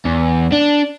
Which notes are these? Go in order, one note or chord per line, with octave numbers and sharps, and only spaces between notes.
E2
D4